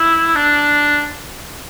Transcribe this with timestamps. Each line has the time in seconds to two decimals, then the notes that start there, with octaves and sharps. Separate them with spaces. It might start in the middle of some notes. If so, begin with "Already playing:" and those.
Already playing: E4
0.36 D4